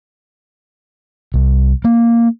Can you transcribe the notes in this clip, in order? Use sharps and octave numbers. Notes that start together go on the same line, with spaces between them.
C2
A#3